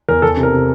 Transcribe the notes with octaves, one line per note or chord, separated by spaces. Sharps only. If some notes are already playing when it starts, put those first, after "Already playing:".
E2 A#4
E2 A4
C3
A#4
C3